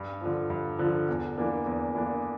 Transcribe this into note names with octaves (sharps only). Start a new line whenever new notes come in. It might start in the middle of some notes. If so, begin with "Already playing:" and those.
Already playing: G2
D3 F3
G2
D3 F3
E2
E3 A#3 D4
E2
E3 A#3 D4